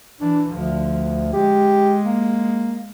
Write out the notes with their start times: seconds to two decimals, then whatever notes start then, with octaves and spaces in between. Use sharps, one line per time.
0.21 E3 D4
0.51 D2 D3 F3
1.33 G#3 G4
2.04 A#3